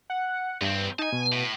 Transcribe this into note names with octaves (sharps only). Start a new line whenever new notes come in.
F#5
E2 G2 C4
D#4 G#5 A5
B2
A2